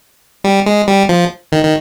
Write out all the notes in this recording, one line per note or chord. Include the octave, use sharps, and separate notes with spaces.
G3
G#3
G3
F3
D#3
D#3